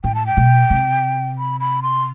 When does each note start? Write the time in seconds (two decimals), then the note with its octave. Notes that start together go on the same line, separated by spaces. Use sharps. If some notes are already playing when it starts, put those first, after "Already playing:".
0.04 A2 G5
0.15 A5
0.26 G5
0.37 B2
0.70 C3
1.39 B5
1.60 B5
1.82 C6